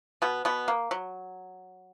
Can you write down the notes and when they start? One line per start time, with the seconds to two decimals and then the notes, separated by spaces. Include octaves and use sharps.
0.22 B2 B3
0.45 B2 B3
0.68 A#3
0.91 F#3